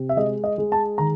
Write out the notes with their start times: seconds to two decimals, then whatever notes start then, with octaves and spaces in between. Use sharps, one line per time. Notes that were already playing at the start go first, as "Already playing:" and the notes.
Already playing: C3
0.09 E5
0.17 G#3 D#5
0.44 D#5
0.58 G#3
0.72 A5
0.98 D#3 A#5